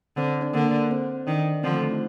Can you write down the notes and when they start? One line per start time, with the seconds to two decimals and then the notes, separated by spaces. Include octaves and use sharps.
0.17 D3 C4 C5
0.41 D4 D5
0.54 D3 A#3 A#4
0.91 C4 C5
1.27 D#3 D4 D5
1.63 D3 F3 C4 C5
1.72 A3 A4
1.82 F4
1.91 D#4